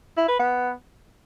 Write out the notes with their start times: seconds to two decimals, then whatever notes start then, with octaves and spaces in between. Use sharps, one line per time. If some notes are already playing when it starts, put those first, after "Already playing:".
0.17 E4
0.28 B4
0.39 B3